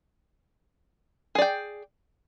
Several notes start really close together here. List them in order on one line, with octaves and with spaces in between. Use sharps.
G#4 D5 G5